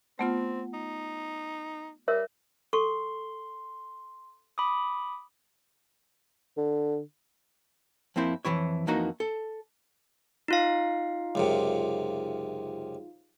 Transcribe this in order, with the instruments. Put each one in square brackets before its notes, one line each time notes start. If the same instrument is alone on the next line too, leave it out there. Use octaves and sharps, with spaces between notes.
[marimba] A3 B3 F4 [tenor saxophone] C4 [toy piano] F#5
[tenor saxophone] D#4
[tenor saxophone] G3 [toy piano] A#4 C#5 E5
[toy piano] A4 C#6 [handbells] C6
[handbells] B5 D6 D#6
[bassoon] D3
[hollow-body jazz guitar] F2 A#3 C4 E4 C5
F2 B2 E3 E4 C#5
F2 E3 A#3 D#4 F#4 A#5
A4
[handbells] D#4 F4 F5
[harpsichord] C#2 F#2 C3